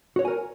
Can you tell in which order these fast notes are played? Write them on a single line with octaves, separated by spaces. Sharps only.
F#4 C#5 F#5 G#5 A#4